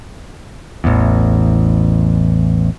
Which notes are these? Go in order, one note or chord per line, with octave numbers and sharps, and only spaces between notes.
A1 E2